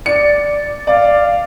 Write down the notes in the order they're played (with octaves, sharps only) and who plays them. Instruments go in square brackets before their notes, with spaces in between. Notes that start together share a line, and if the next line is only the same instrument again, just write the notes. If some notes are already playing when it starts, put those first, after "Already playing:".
[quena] D5 [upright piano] C#7
[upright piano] D5 [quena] F5